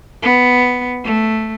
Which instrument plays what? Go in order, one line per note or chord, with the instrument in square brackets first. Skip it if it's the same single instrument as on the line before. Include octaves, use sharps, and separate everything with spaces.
[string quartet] B3
A3